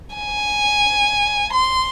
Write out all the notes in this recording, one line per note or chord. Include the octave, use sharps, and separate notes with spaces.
G#5
C6